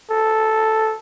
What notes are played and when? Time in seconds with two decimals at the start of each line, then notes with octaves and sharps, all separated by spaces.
0.10 A4